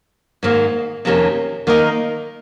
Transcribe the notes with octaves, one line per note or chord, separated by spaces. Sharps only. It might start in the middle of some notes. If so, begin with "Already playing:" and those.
G#2 D#3 A#3
F2 C3 D#3 A#3 C#4
D#3 A#3 D#4 A#4 D#5